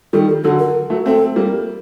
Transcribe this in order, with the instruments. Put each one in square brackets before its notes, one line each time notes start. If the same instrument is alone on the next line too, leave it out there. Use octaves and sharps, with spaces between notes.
[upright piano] D#3 G3 [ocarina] A4
[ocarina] A4
[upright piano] D3 F#3 [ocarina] A4
[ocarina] A#4
[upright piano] F#3 A3
[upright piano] A3 C4 [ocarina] A4
[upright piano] G3 A#3